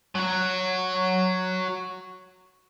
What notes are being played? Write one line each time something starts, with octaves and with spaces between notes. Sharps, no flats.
F#3 F#4